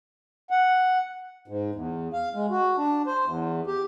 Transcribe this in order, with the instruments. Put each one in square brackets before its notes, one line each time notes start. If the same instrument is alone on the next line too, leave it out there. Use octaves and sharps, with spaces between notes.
[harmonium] F#5
G#2
E2
F5
G#3
F#4
D4
C5
E2
G4